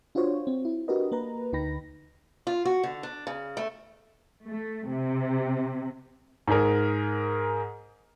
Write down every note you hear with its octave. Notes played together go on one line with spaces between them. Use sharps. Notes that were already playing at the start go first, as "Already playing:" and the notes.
D4 F4 F#4 C5 C#5
C4
E4
D4 F#4 G4 A#4 B4 D#5
A#3 B4 A#5
D2 D3 D#4 G5 B5 A#6
F4
F#4
D3
D4
C#3
A3
A3
C3
G#2 G#4 A#4